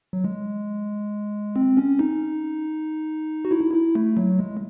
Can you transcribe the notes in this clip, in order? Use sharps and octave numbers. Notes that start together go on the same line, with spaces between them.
F#3
G#3
C4
C#4
D#4
F#4
E4
E4
A3
F#3
G#3